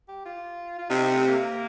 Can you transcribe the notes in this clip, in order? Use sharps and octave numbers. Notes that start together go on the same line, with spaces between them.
G4
F4
F4
C3 D#4
C4
A3
A#3